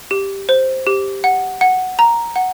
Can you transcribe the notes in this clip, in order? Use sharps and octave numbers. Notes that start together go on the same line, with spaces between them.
G4
C5
G4
F#5
F#5
A#5
F#5